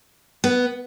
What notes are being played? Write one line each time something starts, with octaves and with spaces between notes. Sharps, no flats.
B3